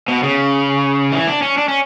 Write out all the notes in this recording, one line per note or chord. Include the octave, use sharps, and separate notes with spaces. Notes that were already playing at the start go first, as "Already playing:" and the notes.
B2
C#3
E3
D4
C#4
D4
C#4